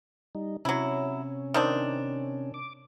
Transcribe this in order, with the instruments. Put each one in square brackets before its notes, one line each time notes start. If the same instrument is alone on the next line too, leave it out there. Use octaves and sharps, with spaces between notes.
[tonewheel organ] G3 D#4
[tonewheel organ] C3 C#4 [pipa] F#3 E4
[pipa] D#3 C4 D4
[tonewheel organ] D6